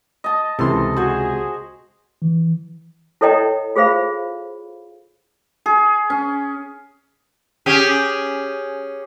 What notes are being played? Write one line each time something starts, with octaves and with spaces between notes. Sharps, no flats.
D#5 A5
C#2 C3 E3 A4 C6
F#4 G#4 C5 G#5
E3
E4 A4 C#5 D#5 G5 A#5
F4 G#4 C5 F5 B5
G#4
C#4
C#4 G4 G#4